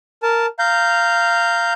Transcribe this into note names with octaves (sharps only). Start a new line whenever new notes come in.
A#4 A5
F5 A#5 G6